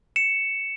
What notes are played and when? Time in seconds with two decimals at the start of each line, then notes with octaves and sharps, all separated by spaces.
0.16 C#7 E7